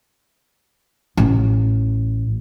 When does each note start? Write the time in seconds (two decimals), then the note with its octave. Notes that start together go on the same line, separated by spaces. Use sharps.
1.17 A1